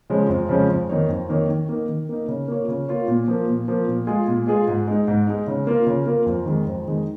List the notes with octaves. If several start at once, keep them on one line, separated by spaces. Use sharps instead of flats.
C#3 F3 G#3 C#4
F2
C#3 F3 G#3 C#4
F2
D#3 A#3 D#4 C#5
F2
D#3 A#3 D#4 C#5
D#3
A#3 D#4
D#3
A#3 D#4
C#3
A#3 F4 C#5
C#3
A#3 F4 C#5
A#2
F3 A#3
A#2
F3 A#3
A#2
G#3 F4 G#4
A#2
G#3 F4 G#4
G#2
G#3 D#4
G#2
G#3 D#4
C#3
A#3 F4 A#4
C#3
A#3 F4 A#4
F2
D#3 G#3 D#4
F2
D#3 G#3 D#4